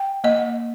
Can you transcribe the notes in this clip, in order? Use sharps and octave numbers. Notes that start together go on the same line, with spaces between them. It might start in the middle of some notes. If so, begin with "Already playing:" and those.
Already playing: G5
A#3 D#5